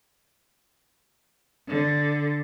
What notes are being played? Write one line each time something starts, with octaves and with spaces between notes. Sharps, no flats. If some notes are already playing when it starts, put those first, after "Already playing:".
D3